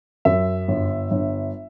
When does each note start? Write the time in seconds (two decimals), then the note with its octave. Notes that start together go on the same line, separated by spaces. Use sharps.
0.25 F#2 E5
0.68 G1
1.11 G1